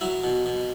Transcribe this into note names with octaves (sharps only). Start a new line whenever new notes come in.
F#3 E4
B2
B2